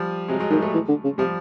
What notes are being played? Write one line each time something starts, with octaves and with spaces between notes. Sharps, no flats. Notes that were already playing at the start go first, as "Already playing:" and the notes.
Already playing: F3 G3
C3 F#3 G#3
F#3 G#3
D#3 G3 A3
G3 A3
E3
D3
C#3
C3 F3 G3